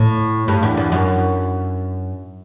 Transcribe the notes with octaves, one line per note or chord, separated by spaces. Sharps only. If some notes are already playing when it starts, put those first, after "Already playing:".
Already playing: A2
G2
E2
E2
F#2